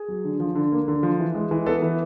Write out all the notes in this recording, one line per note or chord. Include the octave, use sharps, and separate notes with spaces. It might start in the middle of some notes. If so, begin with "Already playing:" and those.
Already playing: G#4
F#3
D3
F3
D3
A#3
D3
F3
E3
G#3
E3
B3 A4
E3